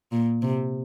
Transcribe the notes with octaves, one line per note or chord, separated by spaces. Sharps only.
A#2
C3